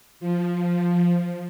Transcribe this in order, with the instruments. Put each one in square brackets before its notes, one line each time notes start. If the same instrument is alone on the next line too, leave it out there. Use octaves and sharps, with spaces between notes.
[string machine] F3